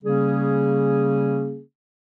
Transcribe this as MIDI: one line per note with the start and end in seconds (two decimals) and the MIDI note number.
0.03 1.60 49
0.03 1.60 55
0.03 1.60 58
0.03 1.60 61
0.03 1.60 68